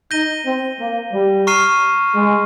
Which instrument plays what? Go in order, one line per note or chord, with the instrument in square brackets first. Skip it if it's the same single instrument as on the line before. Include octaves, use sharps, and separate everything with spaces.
[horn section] D#4 [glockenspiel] G6 A#6 D#7 G7
[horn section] C4
A#3
G3
[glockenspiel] A#5 C#6 F6 C7 D#7
[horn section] G#3